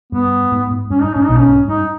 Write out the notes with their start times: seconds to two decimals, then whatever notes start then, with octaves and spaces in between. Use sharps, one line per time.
0.12 G2 B3
0.52 G#2
0.71 G#2
0.90 G2 C#4
1.02 G#2 D#4
1.14 G#2 C#4
1.26 B1 B2 D#4
1.37 C#4
1.49 G#2
1.68 G2 D#4